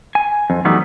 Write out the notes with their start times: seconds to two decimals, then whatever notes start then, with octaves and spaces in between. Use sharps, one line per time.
0.15 G#5
0.50 F2
0.65 E3 F#3 G3 A3 B3 D#4